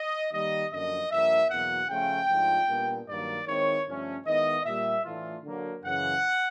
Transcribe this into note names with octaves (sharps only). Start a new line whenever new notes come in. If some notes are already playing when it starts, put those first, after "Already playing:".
Already playing: D#5
D#3 G3 A#3 D#5
F#2 D3 F3 A#3 D#5
G2 D3 F3 A#3 D4 E5
E2 B2 F#3 A#3 F#5
C#3 F3 A3 C#4 F4 G5
G#2 F3 A3 D4 F4
A#2 G3 B3 D4
G2 D#3 F#3 A#3 D5
D#3 G#3 C4 E4 C#5
G2 D3 F3 A3 C#4
D#3 G#3 B3 E4 D#5
A#2 G3 A#3 E5
A2 E3 A3 D4 F4
D3 F#3 A#3
F#2 C#3 E3 F#5